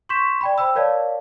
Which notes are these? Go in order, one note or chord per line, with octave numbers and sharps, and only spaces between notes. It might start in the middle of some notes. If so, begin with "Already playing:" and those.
C6 C#6 G6 B6 E7
D5 G5 B5
C5 G5 B5 E6
A#4 C#5 D5 F5 A5